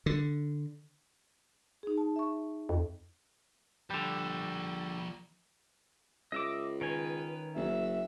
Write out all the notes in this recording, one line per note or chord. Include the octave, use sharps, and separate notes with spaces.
D3
D#4 G#4
A5
E5 C#6
F2
D3 F3 G3 D5
C#2 D#5 E5 D6
D#3 C#4 B4 G#5
F#1 E5